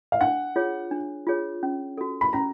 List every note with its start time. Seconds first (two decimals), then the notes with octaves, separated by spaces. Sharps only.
0.12 F5
0.21 D4 F#5
0.56 F4 G#4 C#5
0.91 D4
1.27 F4 G#4 C#5
1.63 C#4
1.98 F#4 A4
2.21 B5
2.33 C#4 A#5